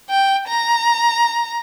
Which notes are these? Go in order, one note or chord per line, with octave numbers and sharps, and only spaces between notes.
G5
A#5